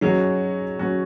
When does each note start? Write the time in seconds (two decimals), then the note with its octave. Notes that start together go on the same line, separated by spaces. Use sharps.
0.01 F#3 C#4 D#4 F#4 G#4
0.79 F#3 C#4 F#4